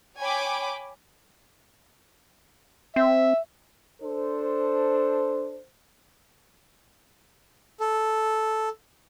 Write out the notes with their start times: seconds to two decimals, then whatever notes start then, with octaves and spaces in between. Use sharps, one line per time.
0.19 C#5 G5 G#5 B5 D6
2.96 C4 E5
4.02 D4 A4 C5
7.80 A4